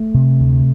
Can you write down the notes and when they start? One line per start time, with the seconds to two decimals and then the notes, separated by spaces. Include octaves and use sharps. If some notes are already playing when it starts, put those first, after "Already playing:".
Already playing: A3
0.14 C3
0.40 D2